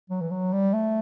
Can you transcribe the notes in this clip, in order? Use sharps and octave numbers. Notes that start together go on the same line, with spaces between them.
F#3
E3
F#3
G3
A3